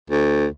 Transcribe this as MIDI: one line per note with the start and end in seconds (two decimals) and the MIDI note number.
0.10 0.45 38